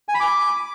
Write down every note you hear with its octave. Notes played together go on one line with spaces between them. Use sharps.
G#5
B5
D6